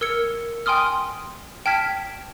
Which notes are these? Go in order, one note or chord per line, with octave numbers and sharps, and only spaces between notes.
A#4 E6 G#6 C#7
G5 G#5 C6 D#6 F6
G5 A5 F6 G#6 B6